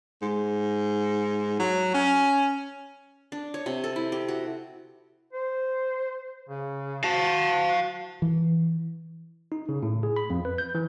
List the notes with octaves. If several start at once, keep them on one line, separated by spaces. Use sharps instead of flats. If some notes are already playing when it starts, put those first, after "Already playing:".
G#2
F#3
C#4
D4
C#5
C3
A4
E4
G4
F#4
C5
C#3
F#4 F5 A5
E3
D#4
C#3
A2
G#4
B5
F2
B4
G6
E3